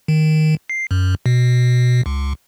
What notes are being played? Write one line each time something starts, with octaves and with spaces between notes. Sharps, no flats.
D#3
C7
F#2
B2
C#2